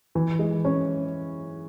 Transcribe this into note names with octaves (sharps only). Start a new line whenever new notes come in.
E3
G#3
C#4